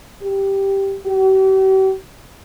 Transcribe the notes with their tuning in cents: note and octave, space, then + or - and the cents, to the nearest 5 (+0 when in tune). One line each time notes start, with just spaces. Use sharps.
G4 +0
G4 -45